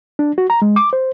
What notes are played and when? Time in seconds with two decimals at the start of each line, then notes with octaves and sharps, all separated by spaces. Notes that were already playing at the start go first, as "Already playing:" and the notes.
0.19 D4
0.38 F#4
0.50 A#5
0.62 G#3
0.76 D6
0.93 C5